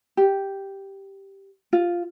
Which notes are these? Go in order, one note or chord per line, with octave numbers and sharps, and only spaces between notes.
G4
F4